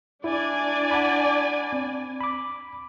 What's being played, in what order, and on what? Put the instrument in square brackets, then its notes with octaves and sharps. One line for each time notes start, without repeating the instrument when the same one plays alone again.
[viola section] D4 D5 G#5 [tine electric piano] E4
[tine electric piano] F#5 A5 B5
C4
B5 D6